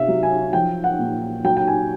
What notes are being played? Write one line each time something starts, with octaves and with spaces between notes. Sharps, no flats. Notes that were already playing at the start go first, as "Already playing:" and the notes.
Already playing: C3 E5 F5
F#3
G#5
F3 G5
F#5
A#2
F#3 G5
G5
G#5